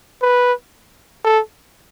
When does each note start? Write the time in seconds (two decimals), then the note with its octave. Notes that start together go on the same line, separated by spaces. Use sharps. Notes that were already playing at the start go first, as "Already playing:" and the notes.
0.22 B4
1.24 A4